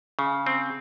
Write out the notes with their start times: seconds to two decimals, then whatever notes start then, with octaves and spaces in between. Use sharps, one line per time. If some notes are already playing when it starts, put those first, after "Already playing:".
0.19 C#3
0.46 C4